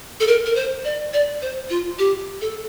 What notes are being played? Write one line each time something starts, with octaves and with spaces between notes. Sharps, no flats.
A4
A#4
A#4
C5
D5
D5
C5
F4
G4
A4